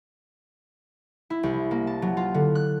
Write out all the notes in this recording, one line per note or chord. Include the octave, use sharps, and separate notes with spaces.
E4
C2
A#3
A5
F#3
F4
D3
F#6